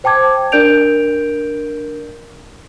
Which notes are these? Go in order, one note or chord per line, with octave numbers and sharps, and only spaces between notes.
C5 G5 A5 D6 G#6
D4 A#4 D5 G6 D7 F7